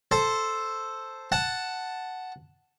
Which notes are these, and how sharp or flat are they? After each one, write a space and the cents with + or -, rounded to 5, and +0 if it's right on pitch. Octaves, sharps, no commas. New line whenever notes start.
A4 +0 C5 +0
F#5 +0 A5 +0